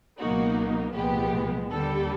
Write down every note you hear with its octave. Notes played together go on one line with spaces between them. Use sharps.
C#2 B2 F#3 A#3 D#4 F#4
C2 A#2 F3 G#3 B3 G4
D#2 D3 G3 A4